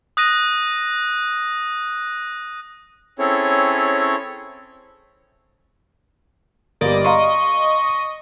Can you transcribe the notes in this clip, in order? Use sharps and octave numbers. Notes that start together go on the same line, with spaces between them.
D#6 F#6 A#6 D#7
C4 C#4 E4 G#4 A4 C#5
G1 G3 A#3 D5 D#5
D#5 F5 A#5 C6 C#6